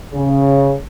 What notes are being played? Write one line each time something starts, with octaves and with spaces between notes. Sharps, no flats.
C#3